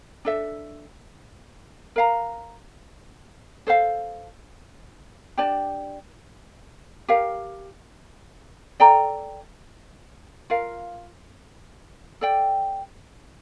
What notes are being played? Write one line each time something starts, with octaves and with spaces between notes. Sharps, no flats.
D4 A4 E5
A#4 F5 A#5
A4 C5 F5
D4 G4 D5 A5
G4 A#4 F5
A4 D5 G5 A#5
F4 A#4 F5
A4 D5 G5